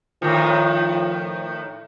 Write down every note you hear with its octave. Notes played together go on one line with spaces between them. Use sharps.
A2 D#3 F3